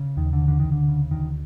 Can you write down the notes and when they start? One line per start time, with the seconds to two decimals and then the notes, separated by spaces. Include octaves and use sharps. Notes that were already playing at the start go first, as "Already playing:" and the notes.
Already playing: C#3
0.17 D#2 D#3
0.33 D3
0.41 C#3
0.48 D3
0.60 D2 D#3
0.72 D3
0.88 C#3
1.11 D2 D#3